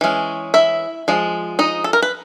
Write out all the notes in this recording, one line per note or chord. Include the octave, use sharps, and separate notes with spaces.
E3 G#3 C#4
E4 E5
F3 G#3
D#4 D#5
A4
A#4
B4